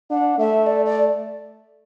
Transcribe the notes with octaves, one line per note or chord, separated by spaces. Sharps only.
D4 F#5
A3 E5
D5
D5